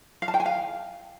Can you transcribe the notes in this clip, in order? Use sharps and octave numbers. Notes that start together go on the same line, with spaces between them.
F5
A5
G5
G#5
F5